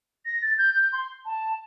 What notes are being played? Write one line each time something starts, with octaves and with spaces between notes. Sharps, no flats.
A#6
A6
G6
G6
C6
A5